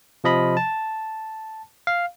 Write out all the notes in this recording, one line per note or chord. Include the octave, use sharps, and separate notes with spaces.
C3 F3 D#5 B5
A5
F5